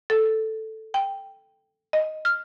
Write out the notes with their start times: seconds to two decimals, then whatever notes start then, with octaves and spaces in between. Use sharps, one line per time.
0.10 A4
0.94 G5
1.93 D#5
2.25 F6